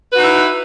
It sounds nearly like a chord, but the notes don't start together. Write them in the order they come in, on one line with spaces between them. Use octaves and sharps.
B4 F#4 D#4 E4